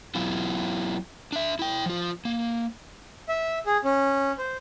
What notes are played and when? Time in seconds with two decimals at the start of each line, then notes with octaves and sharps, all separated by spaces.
0.15 F#3 B3 E4 F4
1.32 D4 E5
1.59 E4 G5
1.86 F3 F4
2.25 A#3
3.29 E5
3.66 G#4
3.84 C#4
4.38 C5